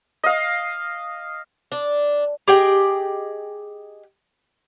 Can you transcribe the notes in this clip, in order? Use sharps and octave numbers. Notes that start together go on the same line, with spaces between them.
D#5 F5
D4
G4 G#4 D#5 G5